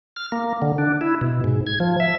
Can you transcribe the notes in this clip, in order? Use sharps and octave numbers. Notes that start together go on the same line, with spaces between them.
F6
A#3
D3
D4
E4
B2
G#2
G#6
F3
E5